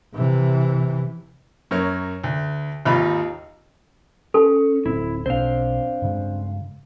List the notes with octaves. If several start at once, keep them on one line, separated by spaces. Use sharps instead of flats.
C3 E3
F#2 A#4 C#5
D2
G#1 D#2 D#4 F4 B5
C#4 A4
D1 C4 E4
B1 C4 D4 C5 F5
G2 C#3 G#3